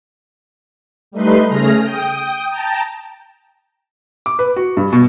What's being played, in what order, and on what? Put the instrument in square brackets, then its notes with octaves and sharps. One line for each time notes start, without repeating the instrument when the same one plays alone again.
[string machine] G3 A3 D#4 B4 C6
C#3 A3 G#4 F6 A#6
G5 D#6
G5 A5 A#5
[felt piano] D6
B4
F#4
G2
B2